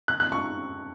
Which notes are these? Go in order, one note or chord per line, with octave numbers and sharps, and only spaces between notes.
F#6
F#6
C#6